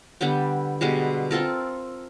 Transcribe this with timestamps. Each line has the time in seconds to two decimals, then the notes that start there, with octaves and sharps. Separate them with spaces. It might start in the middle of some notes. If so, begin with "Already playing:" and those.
0.21 D3 G3 B3 G5
0.81 B2 D3 G3 G#3
1.31 C4 F4 A4 A#4